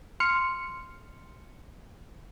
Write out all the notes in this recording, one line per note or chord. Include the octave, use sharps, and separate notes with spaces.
C6 F6 C#7